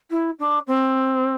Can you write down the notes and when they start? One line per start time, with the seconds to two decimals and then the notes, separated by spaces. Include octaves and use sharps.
0.10 E4
0.39 D4
0.67 C4